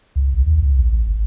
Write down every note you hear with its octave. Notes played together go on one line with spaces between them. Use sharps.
C#2
B1
D#2
C#2
A#1
A1
G1